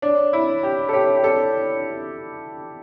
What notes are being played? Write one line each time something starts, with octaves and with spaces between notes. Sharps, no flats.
D4 C#5
E4
C#5
G4
A4
G4 C#5
G4
A4